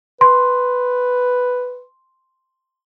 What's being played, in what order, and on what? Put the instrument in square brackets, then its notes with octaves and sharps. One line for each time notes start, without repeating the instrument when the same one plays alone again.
[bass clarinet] B4 [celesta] C6